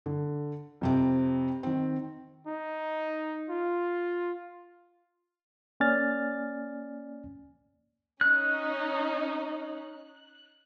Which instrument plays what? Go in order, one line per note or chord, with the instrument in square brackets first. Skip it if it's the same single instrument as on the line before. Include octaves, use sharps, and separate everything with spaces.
[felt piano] D3
F2 C3 C4
D#3 C4
[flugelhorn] D#4
F4
[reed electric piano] A#3 C#4 D5 G#5 F6 A6
[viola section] C#4 D#4 [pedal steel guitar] F#6